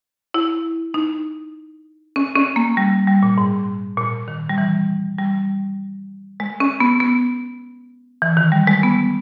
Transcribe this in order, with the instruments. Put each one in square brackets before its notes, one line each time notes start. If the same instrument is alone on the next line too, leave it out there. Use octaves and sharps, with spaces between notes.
[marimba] E4
D#4
C#4
C#4
A#3
G3
G3
A#2
G#2
A#2
D#3
G3
E3
G3
G#3
C#4
B3
B3
E3
D#3
G3
G#3
B3